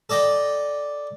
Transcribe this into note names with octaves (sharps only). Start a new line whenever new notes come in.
A4 D5 D#5 G5